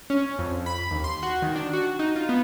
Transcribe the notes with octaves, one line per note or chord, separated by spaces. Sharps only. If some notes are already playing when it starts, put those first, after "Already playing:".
C#4
F2
B5
D#2
C6
F#4
D#3
D4
F#4
D#4
F4
B3